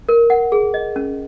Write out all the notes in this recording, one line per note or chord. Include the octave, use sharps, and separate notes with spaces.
A#4
F#5
G#4
D#5
C#4